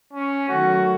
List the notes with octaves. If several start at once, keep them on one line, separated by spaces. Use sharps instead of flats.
C#4
D#3 F#3 A3 F#4